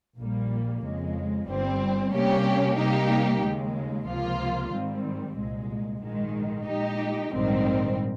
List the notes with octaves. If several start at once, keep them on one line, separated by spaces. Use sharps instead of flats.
A#1 A#2 G3 A#3
F2 C#3 G#3
G1 G2 G3 C4
C3 G3 A#3 C#4 G4
C3 G3 A#3 D#4 G4
D#2 C#3 G#3
C#2 C3 F3 A#3 F4
G#2 D#3 G3 C4
C2 A#2 G#3
A#1 G#2 D#3 G#3
A#2 G#3 D#4 G4
A#1 G#2 D#3 G3 C4